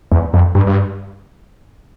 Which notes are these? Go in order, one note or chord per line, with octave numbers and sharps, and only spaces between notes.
E2
F2
G2
G2